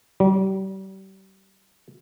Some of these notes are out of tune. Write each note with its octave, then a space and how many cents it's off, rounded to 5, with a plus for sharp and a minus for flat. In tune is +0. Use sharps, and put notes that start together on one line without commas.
G3 -35